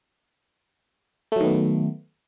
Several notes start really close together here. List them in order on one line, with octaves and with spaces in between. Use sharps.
A3 F#3 D#3 B3